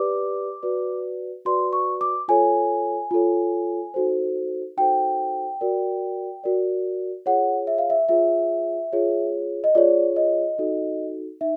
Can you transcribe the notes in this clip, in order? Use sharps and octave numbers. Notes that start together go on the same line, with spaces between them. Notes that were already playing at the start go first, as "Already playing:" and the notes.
Already playing: G4 B4 D5 D6
F#4 B4 D5
F#4 B4 D5 C6
C#6
D6
F4 A4 C#5 G#5
F4 A4 C#5
D#4 F#4 A4 C5
D#4 F#4 A4 C5 G5
F#4 A#4 D5
F#4 A#4 D5
F4 G#4 C#5 F#5
E5
F5
E5
F4 G#4 C#5 E5
F4 G#4 C#5
D#5
F4 G#4 C#5 D5
D#5
D#4 F#4 A4
D#4 E5